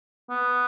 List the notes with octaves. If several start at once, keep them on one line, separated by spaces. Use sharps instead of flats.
B3